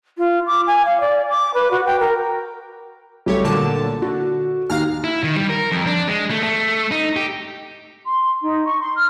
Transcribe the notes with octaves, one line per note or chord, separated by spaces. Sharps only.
F4
D6
G#5
F5
D5
D6
B4
F#4
G5
A#4
B1 F#3 G3 A3 G4 C#5
A#2 D3 A5 D6
D3 F#4
D#2 F5 A#5 F6
E4
D#3
G3
A#4
F2
D4
G#3
A3
A3
D#4
G4
C6
D#4
C#6
C6
F6